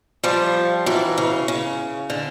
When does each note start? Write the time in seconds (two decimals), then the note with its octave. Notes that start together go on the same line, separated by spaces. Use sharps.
0.24 F3 G3
0.86 E3 F#3
1.18 C#3
1.48 C#3
2.10 D3